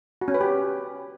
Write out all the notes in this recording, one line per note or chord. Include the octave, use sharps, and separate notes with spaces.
F#4
C#4
B4
G4